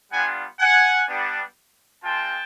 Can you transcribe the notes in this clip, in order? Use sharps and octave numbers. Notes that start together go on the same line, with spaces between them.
G3 B3 D4 F4 F#5 G#5
F#5 G#5
G3 B3 D4
G#3 C4 F4 G5 A5